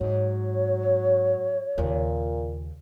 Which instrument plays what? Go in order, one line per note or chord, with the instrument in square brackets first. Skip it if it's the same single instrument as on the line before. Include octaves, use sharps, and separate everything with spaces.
[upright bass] G#2 [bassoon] F#3 [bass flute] C#5
[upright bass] D#2 C#3 [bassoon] A#2